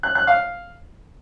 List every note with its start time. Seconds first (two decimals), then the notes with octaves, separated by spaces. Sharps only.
0.03 F#6
0.15 F#6
0.27 F5